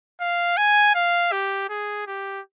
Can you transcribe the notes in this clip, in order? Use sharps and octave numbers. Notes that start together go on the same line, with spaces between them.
F5
G#5
F5
G4
G#4
G4